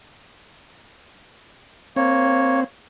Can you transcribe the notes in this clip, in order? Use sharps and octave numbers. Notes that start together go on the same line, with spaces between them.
A#3 C4 C#5